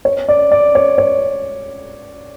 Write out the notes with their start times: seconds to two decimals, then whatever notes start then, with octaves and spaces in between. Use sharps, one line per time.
0.05 C#5
0.29 D5
0.52 D5
0.75 C#5
0.98 C#5